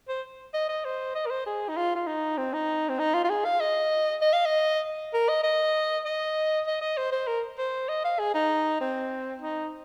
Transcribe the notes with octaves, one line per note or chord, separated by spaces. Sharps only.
C5
D#5
D#5
C5
D#5
A#4
C5
G#4
D#4
F4
F4
D#4
C4
D#4
C4
D#4
F4
F4
G#4
F5
D#5
D#5
F5
D#5
A#4
D#5
D#5
D#5
D#5
D#5
C5
C5
A#4
C5
D#5
F5
G#4
D#4
C4
D#4